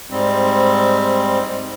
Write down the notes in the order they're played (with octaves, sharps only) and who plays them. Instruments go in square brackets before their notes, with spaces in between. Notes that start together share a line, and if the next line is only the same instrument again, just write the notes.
[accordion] G#2 G3 C4